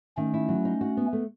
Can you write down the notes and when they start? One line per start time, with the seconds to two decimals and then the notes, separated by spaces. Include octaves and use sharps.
0.17 D#3 A3 C#4
0.34 E4
0.49 F#3
0.65 D#4
0.81 F#4
0.97 B3
1.13 A3